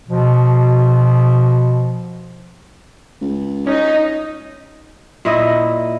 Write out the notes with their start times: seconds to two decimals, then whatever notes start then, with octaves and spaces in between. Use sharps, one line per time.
0.09 B2 F3
3.22 C#2
3.67 C#4 D#4
5.25 A#2 E4 D#5